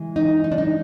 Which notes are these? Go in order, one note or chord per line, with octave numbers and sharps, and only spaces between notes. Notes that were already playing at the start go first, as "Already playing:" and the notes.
Already playing: E3 G#3
D#4
D#4
D4
D#4